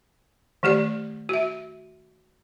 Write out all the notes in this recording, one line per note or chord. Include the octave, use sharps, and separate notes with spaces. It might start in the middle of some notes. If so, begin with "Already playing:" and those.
D#3 A3 G4 D5
F#4 E5